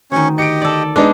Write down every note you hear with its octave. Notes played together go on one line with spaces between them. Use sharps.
D2 D#3 C#4 C#5
G4 D#5 C#7 D7
A4 D5
G#3 B3 D4 D#4